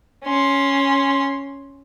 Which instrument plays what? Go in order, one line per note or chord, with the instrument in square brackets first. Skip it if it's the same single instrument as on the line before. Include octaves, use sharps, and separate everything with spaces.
[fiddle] C#4 C6